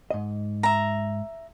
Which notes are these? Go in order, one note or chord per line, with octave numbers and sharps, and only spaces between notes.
G#2 D#5
E5 A#5